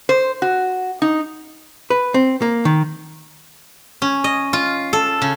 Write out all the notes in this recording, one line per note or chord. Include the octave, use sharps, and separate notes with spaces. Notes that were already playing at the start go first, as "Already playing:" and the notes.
C5
F#4
D#4
B4
C4
A#3
D#3
C#4
D#5
F4
A4
C#3